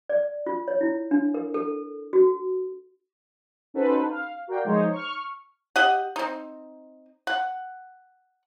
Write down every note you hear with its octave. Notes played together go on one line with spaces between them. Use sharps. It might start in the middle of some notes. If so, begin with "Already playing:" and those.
D5
F4
C#5
E4
D4
A#4
A4
F#4
C#4 D#4 F#4 A4 B4 C5
F5
F#4 A#4 D5 F5 G5
F3 G#3 D#4 G#4 C5 C#5
C#6 F6
G4 D#5 F#5
C4 D#4
F#5